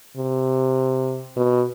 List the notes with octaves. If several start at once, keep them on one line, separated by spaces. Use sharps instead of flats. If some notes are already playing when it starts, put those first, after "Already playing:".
C3
B2